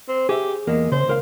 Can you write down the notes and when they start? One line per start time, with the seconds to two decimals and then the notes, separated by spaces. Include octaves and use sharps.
0.09 C4
0.29 G4 G#4 E5
0.67 E2 G#3 A#3
0.92 C#3 C5
1.08 C#2 A#4 F5